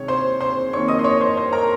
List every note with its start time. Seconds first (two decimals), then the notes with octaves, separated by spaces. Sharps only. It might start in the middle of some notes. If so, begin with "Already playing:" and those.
Already playing: C3 D#3 G#3 C#5
0.08 C5 C6
0.41 C5 C6
0.73 F2 D#3 A#3 C#5 C#6
0.88 D#5 D#6
0.99 C6
1.04 C#5 C#6
1.21 C5 C6
1.37 C5 C6
1.53 A#4 A#5